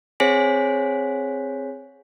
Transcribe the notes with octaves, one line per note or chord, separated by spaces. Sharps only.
C4 G#4 C5 C#5 G#5 B6